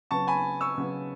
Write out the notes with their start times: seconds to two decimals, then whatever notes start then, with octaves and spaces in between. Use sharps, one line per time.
0.11 C#3 F#3 B3 A5 C#6
0.27 G#5 B5
0.61 C#6 E6
0.78 C#3 F#3 B3